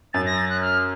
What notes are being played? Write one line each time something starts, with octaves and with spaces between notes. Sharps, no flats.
F#2 A6
A#6
A6
F#6
F6